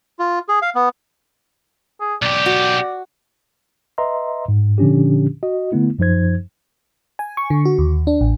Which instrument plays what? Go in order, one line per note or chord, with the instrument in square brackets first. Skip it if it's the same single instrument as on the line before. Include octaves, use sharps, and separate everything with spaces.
[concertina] F4
G#4
F5
B3
[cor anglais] G#4
[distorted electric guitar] B1 G4 [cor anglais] D5
[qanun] F#4
[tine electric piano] B4 D#5 E5 A#5 C6
G#2
A#2 D3 F3 C#4 D4 G4
F#4 D#5
D3 A3 B3 E4
F#2 F3 D#4 C5 G#6
[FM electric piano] G#5
C#6
D3
F#4
D#2
D4
A1